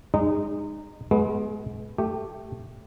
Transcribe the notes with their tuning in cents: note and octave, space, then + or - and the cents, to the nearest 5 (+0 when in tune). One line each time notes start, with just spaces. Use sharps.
G#3 -30 D#4 -20
G#3 +30 B3 +0
A3 +0 G4 +0